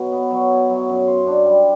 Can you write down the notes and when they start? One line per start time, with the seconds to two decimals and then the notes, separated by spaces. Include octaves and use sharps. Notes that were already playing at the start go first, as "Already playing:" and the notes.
Already playing: B2 F#3
0.12 B3
0.31 F#3
0.50 E4
0.69 F#3
0.89 F#2
1.07 C5
1.27 D4
1.45 G3